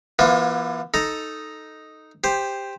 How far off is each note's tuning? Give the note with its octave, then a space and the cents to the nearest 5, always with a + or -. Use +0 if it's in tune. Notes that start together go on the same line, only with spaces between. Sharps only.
E3 +30 B3 -45 F4 +35
D#4 +0 A4 +0 A#5 +0
G4 +15 C5 +0